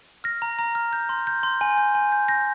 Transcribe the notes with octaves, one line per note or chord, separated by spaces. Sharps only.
F6 A#6
A#5
A#5
F6
G6
C6
G6
C6
G#5
G6
G#5
G6
G6 A#6